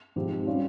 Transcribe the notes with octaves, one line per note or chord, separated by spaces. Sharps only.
G#2 F3 C4 G4
G3 C#4 F4